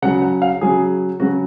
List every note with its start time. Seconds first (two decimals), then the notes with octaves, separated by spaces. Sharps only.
0.02 C#3 F#5
0.06 F#3
0.22 F#5
0.42 F5
0.61 C#3 F#3 G#4
1.20 C#3 F#3 F#4